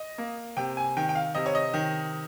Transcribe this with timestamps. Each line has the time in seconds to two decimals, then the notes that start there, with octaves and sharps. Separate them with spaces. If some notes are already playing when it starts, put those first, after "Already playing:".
Already playing: D#5
0.18 A#3
0.57 C3 G5
0.77 G#5
0.97 D#3 G5
1.09 G5
1.15 F5
1.35 C3 D#5
1.46 C#5
1.55 D#5
1.74 D#3